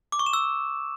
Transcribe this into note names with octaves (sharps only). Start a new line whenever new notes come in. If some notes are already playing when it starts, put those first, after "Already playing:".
D6
C#6
E7
E6